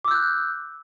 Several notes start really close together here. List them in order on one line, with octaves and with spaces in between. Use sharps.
D6 E6 G6 F#6